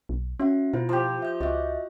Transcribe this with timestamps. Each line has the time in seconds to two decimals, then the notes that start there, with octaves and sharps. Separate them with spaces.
0.09 B1
0.40 C#4 F#4 E5 F#5
0.74 B2 E4 F4 C5
0.89 F3 G4
1.22 E5 G6
1.41 C#2 F#4 D#5 E5